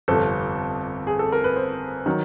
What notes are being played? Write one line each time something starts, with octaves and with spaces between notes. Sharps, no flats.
G1 F2 C3 A4
G#4
A4
A#4
B4
C5
D#3 F#3